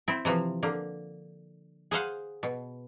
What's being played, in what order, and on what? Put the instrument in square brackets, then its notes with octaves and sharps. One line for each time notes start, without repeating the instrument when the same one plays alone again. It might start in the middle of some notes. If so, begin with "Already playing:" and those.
[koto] C4 E4
C3 E3 F3
D3 A#3
G#4 C5 F5 F#5
B2